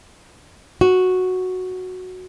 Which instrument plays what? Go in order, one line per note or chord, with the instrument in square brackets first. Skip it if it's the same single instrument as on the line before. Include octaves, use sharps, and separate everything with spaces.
[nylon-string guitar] F#4